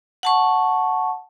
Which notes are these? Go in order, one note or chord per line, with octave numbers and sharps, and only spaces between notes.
F#5 A5 C#6